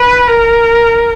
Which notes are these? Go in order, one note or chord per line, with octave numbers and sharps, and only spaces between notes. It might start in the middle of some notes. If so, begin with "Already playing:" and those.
Already playing: B4
A#4